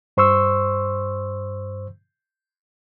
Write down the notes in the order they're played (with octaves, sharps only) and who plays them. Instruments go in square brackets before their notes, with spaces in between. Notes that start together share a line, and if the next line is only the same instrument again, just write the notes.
[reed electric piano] G2 C5 C6 C#6 E6